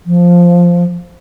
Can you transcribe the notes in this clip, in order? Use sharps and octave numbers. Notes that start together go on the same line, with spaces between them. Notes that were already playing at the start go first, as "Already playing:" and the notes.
F3